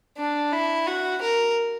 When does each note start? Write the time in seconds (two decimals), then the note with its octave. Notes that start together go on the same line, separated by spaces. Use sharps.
0.17 D4
0.52 E4
0.86 F#4
1.22 A#4